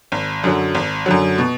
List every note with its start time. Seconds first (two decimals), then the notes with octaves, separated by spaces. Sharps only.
0.12 G#1
0.44 F#2 D3 F#3
0.75 G#1
1.06 F#2 D3 F#3
1.38 B2